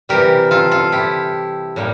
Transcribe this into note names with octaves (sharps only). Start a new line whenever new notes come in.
C3 E3 G3 G4 A#4
F4 A4
F4 A4
E4 G4
A2 G3 A#3